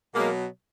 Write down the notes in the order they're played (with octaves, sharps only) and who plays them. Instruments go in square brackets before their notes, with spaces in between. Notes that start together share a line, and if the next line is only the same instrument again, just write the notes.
[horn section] B2 F#3 G#3 A#3